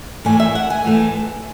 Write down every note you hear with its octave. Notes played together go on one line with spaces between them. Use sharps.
A2 E3 A3 G#5
E5
F#5
G#5
A2 E3 A3